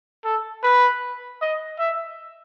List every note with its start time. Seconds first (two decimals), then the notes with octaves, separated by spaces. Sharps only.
0.24 A4
0.63 B4
1.41 D#5
1.79 E5